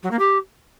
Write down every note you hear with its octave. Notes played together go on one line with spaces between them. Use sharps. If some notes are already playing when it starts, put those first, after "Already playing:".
F#3
A#3
G4